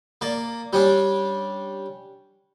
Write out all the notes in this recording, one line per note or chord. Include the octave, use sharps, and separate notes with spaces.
A#3 D5
G3 C#4 D4